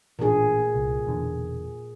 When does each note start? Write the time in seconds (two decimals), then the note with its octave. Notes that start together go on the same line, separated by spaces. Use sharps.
0.19 A1 A#2 D4 G#4
0.74 C2
1.06 E1 E2 D3